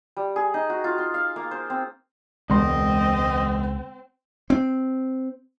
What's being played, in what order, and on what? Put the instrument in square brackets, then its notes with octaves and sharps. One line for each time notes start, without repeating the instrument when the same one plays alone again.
[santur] G3
G#4
D#4
F#4
F4
C6
F5
A#3
C5
C4
[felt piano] E1 B5 C6 [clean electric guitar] C#2 [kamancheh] C4 [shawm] D#5
[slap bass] C4